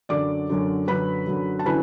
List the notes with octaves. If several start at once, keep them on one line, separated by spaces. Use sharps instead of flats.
F#2 D3 F#3 D5 D6
F#2 D3 F#3
F#2 D3 F#3 B4 B5
F#2 D3 F#3
A5
D3 F#3 C#4 E4 B4 B5